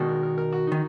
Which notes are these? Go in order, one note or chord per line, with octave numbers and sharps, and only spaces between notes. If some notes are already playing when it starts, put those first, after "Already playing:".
Already playing: B2 D#3 G#3 D4 F#4
A#4
A#4
A#4
F#4
D#3 D#4